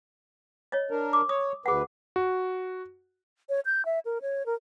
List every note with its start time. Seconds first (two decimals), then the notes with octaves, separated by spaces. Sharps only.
0.72 C#5 D#5
0.91 D4 A#4
1.13 D6
1.29 C#5 D#6
1.66 D2 G#4 B4 F#5
2.16 F#4
3.49 C#5
3.66 G6
3.85 E5
4.05 A#4
4.22 C#5
4.46 A#4